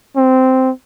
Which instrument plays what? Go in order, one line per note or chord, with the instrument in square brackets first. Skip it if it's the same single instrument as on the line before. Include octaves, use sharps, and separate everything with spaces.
[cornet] C4